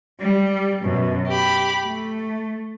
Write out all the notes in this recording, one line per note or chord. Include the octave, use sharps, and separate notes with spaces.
G3
F#2 B2
G4 B5
A3